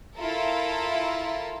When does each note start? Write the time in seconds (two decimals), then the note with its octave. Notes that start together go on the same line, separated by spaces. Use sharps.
0.16 E4 F4 A4 A#4